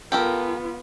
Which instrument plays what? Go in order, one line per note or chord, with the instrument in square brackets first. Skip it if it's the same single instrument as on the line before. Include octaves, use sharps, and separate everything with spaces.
[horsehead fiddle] B3 F4 [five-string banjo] G4 A4 A#4